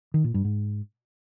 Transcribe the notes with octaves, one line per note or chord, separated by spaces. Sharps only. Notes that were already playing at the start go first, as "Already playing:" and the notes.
D#3
A#2
G2
G#2